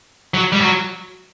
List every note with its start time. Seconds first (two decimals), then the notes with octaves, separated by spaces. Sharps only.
0.34 F#3
0.52 G3
0.61 F#3